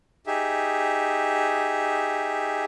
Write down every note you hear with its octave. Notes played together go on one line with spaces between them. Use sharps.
D#4 G4 G#4 E5